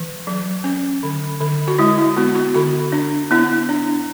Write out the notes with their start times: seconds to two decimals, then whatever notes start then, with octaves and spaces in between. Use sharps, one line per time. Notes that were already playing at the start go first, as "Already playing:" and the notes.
Already playing: E3
0.27 F#3
0.64 C#4
1.03 D3
1.41 D3
1.68 F#4
1.79 G#3 E4
1.98 E4
2.17 B3 F#4
2.35 F#4
2.54 D3 F#4
2.92 D4
3.31 B3 E4
3.69 D4